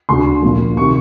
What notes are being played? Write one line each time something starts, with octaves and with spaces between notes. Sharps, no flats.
D2 D3 C6
A#1 A#2
C3 D#3 C#6